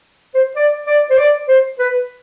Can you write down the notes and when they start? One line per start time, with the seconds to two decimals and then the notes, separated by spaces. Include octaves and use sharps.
0.34 C5
0.56 D5
0.86 D5
1.10 C5
1.17 D5
1.48 C5
1.79 B4